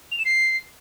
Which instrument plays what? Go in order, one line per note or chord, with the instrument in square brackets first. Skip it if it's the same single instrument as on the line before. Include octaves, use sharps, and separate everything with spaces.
[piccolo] F7
E7
C7